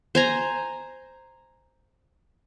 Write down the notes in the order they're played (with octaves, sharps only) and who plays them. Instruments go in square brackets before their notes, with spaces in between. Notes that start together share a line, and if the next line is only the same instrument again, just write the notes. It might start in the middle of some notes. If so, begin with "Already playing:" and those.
[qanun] C5 G#5 A#5